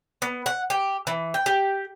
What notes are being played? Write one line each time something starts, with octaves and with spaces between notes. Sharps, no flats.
B3
F#5
G4
E3
G5
G4